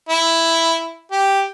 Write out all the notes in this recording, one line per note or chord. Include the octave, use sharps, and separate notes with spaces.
E4
G4